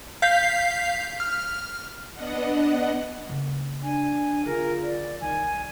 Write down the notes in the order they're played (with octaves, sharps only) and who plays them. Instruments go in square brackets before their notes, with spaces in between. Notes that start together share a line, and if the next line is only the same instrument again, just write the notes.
[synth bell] F5 G6 B6 C7
F6
[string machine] B3 D4 D#5 F#5
[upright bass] C#3 A#3
[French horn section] D4 [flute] G#5
[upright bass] D3 B3 [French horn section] F4 G#4 [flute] A#4
[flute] D5
[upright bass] C2 [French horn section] D#3 [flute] G#5